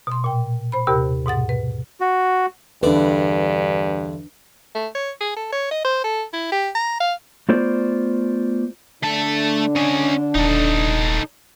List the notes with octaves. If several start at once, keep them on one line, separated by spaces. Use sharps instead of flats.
B2 C6
A#2 G5
C5 B5
D#2 C3 G4 A#4 B5
G#2 B2 F#5 A6
B4
F#4
E2 G2 D3 D4 B4 D5
A3
C#5
G#4
A4
C#5
D#5
C5
A4
E4
G4
A#5
F5
A3 B3 F4 C5 D5
D3 A3 D4 A5
C#4 D#5
D#1 D#4 A4